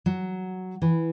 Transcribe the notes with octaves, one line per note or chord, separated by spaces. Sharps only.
F#3
E3